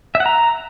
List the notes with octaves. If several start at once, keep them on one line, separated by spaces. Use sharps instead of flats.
E5
F#5
A#5